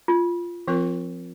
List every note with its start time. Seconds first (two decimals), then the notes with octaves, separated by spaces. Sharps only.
0.08 F4
0.68 F3 C4 F4 A#4